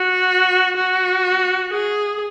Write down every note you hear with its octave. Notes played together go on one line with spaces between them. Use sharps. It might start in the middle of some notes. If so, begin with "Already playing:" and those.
Already playing: F#4
F#4
G#4